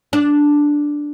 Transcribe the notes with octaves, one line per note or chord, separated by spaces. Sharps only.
D4